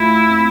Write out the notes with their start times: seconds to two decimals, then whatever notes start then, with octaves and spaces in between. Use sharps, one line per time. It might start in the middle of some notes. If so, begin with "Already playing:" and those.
Already playing: A3 E4 F4
0.30 C4